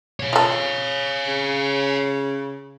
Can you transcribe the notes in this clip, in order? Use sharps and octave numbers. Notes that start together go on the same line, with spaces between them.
C#5 F5
F4 A4
C#3